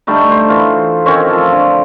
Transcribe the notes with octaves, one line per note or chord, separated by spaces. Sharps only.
D3 G3 A3 D#4
C5
E3 F4
D#3 C4 C#4 C#5
F3 A4
D3